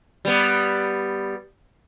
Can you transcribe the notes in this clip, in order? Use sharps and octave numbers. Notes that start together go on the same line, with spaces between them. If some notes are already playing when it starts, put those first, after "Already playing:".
G3 B3